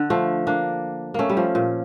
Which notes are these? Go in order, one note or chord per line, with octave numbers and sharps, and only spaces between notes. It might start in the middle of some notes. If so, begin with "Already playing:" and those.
Already playing: D3
F3 A3
A#3 D4
A3 A#3 C#4
G3
F3
A#2